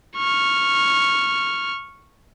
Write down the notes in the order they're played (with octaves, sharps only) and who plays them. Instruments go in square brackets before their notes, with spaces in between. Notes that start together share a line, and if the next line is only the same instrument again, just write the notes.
[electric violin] C#6 F6